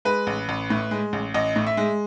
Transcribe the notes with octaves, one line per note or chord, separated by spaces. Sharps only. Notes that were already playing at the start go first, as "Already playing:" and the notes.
G#3 B4
A1
A1
A2
G#3
A1
A1 D#5
A2
E5
G#3